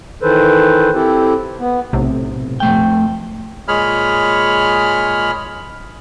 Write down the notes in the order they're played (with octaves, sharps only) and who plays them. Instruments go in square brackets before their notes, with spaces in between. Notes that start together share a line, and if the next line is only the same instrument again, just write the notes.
[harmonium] D#3 E3 A4 B4 C5
C4 E4 G4 A4
B3
[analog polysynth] B1 A2 C3
[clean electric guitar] F2 A3 G5
[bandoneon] A#2 G#3 G#4 C#5 B5 F6